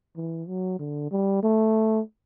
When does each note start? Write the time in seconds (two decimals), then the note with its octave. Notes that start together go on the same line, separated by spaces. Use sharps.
0.17 E3
0.48 F#3
0.79 D3
1.11 G3
1.43 A3